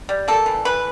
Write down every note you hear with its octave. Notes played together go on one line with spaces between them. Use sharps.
G3
A#3 A4
E3
E3 B4